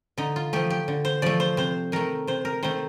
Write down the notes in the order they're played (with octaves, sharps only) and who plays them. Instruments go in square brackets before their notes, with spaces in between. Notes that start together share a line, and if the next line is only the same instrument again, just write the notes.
[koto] D3 D#4
F4
F3 A3 G4
G4
D3
C5
F3 A3 D5
C5
C3 C5
D#3 A3 A#4
C3 C5
A#4
D#3 A3 C5